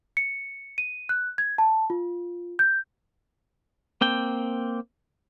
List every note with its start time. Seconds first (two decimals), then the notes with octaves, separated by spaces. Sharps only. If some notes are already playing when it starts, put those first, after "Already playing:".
0.17 C#7
0.78 D#7
1.09 F#6
1.38 G#6
1.58 A5
1.90 F4
2.59 G6
4.01 A#3 C4 G5